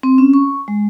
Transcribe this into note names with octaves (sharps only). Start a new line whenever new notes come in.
C4
C#4
C#6
G#3